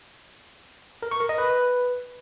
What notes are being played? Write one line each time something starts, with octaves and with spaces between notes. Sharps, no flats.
A#4
C#6
A#4
D#5
B4